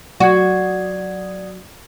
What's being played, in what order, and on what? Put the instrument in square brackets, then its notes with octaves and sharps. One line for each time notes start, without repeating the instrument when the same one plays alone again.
[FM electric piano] F#3 D#6 [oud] F#4 [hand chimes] D5 F#5 G#6